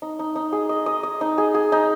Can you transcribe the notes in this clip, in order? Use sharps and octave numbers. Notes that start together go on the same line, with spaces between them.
D#4
D#4
D#4
G#4
D#5
D#5
D#5
D#4
G#4
G#4
D#4